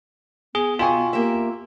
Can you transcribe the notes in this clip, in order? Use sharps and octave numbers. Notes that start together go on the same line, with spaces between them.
B3 G#4
B2 F4 G5 G#5 C#6
A#3 G4 E5